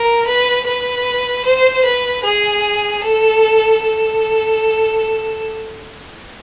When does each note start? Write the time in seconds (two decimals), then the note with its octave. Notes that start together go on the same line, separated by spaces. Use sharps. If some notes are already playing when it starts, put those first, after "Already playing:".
Already playing: A#4
0.27 B4
0.66 B4
1.45 C5
1.85 B4
2.24 G#4
3.04 A4
3.83 A4